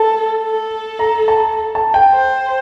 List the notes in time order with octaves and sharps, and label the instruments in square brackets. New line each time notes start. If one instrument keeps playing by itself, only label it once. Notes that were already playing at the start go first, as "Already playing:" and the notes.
Already playing: [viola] A4 [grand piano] A5
[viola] A4
[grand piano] A#5
A5
A5
G5
[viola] C5